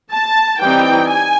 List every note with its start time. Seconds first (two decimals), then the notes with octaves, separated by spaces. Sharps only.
0.12 A5
0.60 E3 G3 C4 D#4 G5
1.09 G#5